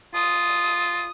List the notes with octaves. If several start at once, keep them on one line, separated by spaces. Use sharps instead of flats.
F4 D#6